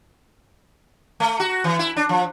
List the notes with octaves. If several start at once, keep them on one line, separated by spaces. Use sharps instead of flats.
A3
F#4
E3
E4
D4
F3